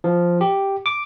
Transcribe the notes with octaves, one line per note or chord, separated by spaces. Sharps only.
F3
G4
D6